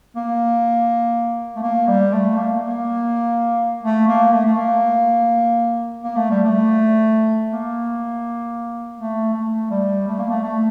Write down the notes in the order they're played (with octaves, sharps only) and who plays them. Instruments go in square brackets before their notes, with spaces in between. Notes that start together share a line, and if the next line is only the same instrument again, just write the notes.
[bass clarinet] A#3
A3
A#3
G3
A3
A#3
A#3
A3
A#3
A3
A3
A#3
A#3
A3
G3
A3
A#3
A3
A3
G3
A3
A#3
A3
A3